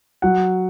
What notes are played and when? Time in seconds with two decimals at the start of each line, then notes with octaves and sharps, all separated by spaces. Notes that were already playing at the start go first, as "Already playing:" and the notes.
0.22 F#3 F#5